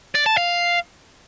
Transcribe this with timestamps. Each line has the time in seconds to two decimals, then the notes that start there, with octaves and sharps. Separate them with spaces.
0.15 D5
0.26 A5
0.37 F5